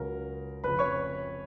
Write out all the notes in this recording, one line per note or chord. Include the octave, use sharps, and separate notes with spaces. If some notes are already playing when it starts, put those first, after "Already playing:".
Already playing: C#2 C#3 F#3 A#4
F1 F2 C#3 B4 B5
C#5 C#6